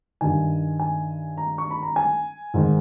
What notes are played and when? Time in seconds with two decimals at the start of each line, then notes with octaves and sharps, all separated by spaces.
0.21 G2 D#3 G#5
0.79 G#5
1.37 A#5
1.58 C#6
1.71 B5
1.83 A#5
1.96 G#5
2.54 G#2 D#3